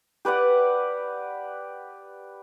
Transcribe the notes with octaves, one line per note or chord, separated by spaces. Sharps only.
G4 B4 D5 F#5